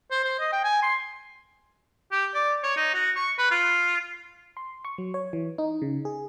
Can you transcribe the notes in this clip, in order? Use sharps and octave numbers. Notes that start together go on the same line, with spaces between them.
C5
C5
D#5
G5
G#5
C6
G4
D5
C#5
D#4
F#4
C#6
B4
F4
C6
C#6
F#3
C#5
E3
D#4
C#3
G#4